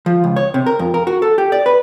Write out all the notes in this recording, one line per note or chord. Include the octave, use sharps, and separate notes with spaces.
F3
C#2
C#5
C3
A#4
F2
A#4
F#4
A4
G4
D5
B4